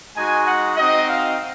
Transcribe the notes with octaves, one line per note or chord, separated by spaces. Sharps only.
G#3 D#4 F#4 G#5
F#5
C4 D#4 F#4 D#5
F5